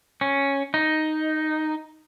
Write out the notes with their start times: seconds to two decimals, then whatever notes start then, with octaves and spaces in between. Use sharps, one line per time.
0.21 C#4
0.74 D#4